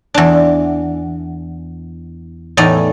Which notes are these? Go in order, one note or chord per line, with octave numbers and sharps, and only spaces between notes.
E2 D4
E2 A2 D#4 D5